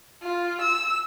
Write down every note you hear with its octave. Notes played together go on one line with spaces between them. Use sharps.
F4
E6